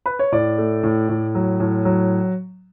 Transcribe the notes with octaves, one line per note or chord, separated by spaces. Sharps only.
B4
C#5
A2 D5
A3
A2
A2
F#3
A2
F#3